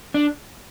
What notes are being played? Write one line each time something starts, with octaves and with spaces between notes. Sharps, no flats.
D4